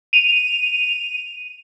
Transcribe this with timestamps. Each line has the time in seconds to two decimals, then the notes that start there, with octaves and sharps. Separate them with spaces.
0.13 D#7 F7